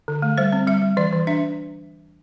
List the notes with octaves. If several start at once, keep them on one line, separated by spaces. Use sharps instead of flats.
D3
A3
G3 C5
C4
G3 E5
G3
E3 D5
E3
D4 E5